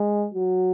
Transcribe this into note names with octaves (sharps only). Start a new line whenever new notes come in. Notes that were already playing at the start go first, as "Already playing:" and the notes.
Already playing: G#3
F#3